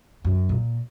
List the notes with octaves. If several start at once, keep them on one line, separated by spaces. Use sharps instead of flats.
F#2
A#2